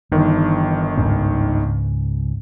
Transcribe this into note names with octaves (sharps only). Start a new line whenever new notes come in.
G1 D#3 E3
C#2 G#2 C#4